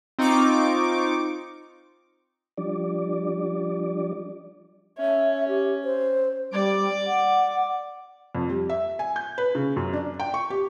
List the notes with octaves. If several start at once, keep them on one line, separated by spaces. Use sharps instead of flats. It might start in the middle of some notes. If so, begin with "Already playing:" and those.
C4 D#4 F4 C#6 D6
F3 G3 D4 D5
C#4 E5
G4
C5
G3 D5 D6
F#5
F2
G3
E5
G#5
G6
B4
C#3
F#2
D4
G5
C#6
G4